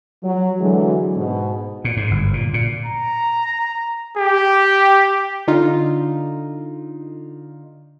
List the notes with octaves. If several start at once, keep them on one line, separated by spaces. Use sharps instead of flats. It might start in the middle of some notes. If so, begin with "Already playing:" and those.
F#3
D3 E3 F#3 G#3
G#2 B2
A#2
G#2
G1
A#2
A#2
A#5
G4
D3 D#4 F4